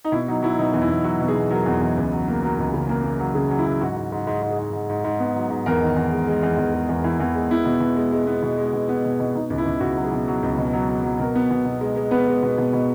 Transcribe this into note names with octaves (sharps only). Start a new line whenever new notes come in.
D#4
B2 E4
F#3 D#4
F#3 E4
B2 D#4
E2
E4
E2
F#3 F#4
B2
G#4
B2
F#3 A#4
E2
E2
C#2
F#3
A#3
F#3 A#4
C#2
C#3
A#3
A#3
F#3
C#3 G#4
F#3
E4
F#3
G#2 F#4
G#2
G#2
G#2 G#4
G#2
G#4
G#2
G#2
G#2
G#2
B3
F#3
G#2
E2 A#4
D#3
E2
G#3
G#3
E2
E2
G#3
E2
E2 E4
E2
G#3
B3 E4
B2
B2
G#3
G#3
B3
B2
G#3
B2
B3
B2
B2
B2 D#4
C#2
E4
C#2
C#2 F#4
F#3
G#4
B2
F#3
C#2
B2
F#3
F#3
F#3
B2 A#4
B3
B2
B2
G#3
G#3
B3 B4
G#3
B2
B2
B2